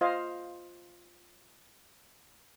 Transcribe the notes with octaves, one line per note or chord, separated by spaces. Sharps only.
F4 C5 D#5 F5